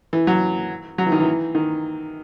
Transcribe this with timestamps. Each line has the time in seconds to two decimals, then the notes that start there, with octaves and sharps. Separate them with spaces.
0.13 E3
0.27 F#3
0.98 F#3
1.06 E3
1.12 D#3
1.20 E3
1.55 D#3